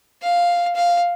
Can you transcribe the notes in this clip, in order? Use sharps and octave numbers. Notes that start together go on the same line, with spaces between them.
F5
F5